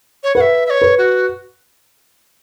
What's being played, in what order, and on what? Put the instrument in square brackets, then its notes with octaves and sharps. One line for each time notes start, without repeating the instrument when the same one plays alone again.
[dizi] C#5
[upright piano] B4 [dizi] F#5
[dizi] E5
E5
C#5
[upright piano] B4
[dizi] F#4